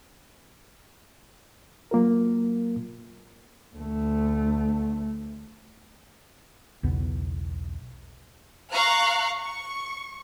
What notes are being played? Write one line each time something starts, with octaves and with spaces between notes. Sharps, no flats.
F#3 A#3 F4 A#4
D2 A3
B1 E2 C#3 B3
F5 A#5 C#6 F#6
C#6